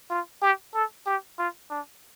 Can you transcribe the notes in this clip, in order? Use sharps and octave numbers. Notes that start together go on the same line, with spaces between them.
F4
G4
A4
G4
F4
D4